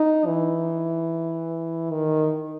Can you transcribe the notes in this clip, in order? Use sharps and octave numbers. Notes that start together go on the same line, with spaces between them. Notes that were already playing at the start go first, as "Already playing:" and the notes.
Already playing: D#4
E3
D#3